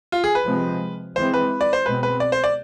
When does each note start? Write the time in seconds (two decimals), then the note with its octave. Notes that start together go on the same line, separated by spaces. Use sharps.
0.12 F4
0.24 G#4
0.35 B4
0.46 C3 F3 G#3 C4
1.16 E3 G#3 C4 C5
1.34 B4
1.61 D5
1.73 C5
1.86 B2 G#3 C4 B4
2.03 B4
2.20 D5
2.32 C5
2.44 D5